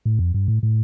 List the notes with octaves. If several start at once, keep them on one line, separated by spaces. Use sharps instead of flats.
A2
F2
G2
A2
A2